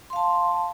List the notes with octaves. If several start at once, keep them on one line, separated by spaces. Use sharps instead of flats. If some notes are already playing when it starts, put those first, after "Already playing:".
F5 A5 C6